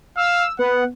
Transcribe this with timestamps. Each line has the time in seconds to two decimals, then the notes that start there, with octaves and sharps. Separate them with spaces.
0.17 F5 E6
0.59 B3 F#5